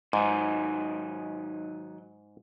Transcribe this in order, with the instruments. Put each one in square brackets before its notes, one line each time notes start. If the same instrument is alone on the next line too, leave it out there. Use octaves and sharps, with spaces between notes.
[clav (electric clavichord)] G#2 [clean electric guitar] D#3 F#3 D#4